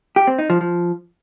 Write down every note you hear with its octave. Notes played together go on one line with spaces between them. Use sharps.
G4
C4
D#4
F3
F3